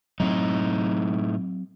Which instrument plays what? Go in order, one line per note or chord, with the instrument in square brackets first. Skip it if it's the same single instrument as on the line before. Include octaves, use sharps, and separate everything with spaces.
[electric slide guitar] A2 D#4 [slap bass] F#3 C4